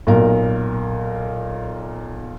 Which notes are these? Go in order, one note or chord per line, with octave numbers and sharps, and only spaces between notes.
B1 A#2 A#4